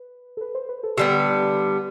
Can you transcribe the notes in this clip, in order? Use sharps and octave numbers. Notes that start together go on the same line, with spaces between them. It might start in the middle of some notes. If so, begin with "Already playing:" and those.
Already playing: B4
A4
B4
C5
B4
A4
D3 G3 B3 G4